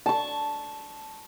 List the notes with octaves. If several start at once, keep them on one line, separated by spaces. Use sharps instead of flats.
A5 C#6